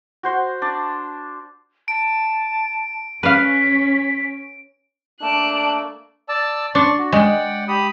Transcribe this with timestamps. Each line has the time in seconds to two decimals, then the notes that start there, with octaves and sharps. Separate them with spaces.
0.23 F#4 C5 C6
0.62 D4
1.88 A5 D7
3.23 C#4 B4 F5 B6
5.21 A3 A#3 D4 A5 F#6 D7
6.29 D5 A5 E6
6.75 D4 A5 C6 C#6
6.99 F#4
7.13 G#3 D5 F#5 G5
7.68 G4 B5 D#6